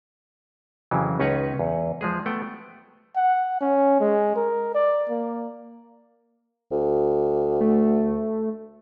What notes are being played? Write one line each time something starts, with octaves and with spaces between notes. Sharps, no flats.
F2 C#3 E3 F#3
C#2 C#4 D#4 B4 C#5 F#5
E2
F3 G#3 G#4
A3 B3 F#5 G5
F#5
C#4
G#3
A#4
D5
A#3
D2
A3